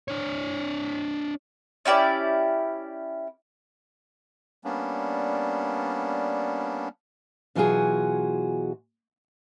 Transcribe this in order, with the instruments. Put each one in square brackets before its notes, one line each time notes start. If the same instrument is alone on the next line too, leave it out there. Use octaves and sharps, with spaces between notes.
[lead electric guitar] D4 C#5
[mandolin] C#4 E4 G4 D5
[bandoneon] G3 A#3 B3 C#4 D4
[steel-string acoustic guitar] B2 E3 F#3 F4 F#4 G#4